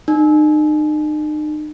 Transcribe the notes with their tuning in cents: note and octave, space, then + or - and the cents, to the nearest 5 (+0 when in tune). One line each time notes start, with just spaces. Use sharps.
D#4 -40